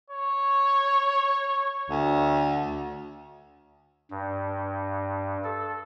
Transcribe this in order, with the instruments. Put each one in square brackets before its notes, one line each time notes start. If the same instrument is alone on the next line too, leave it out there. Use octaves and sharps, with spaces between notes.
[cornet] C#5
[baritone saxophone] D2
[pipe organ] G2
A4